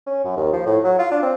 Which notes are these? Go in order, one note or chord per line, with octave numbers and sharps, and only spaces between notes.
C#4
F#2
D#2
F3
A2
F#3
F4
D4
C4